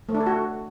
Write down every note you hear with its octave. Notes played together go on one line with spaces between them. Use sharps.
A3
D4
A4
F#4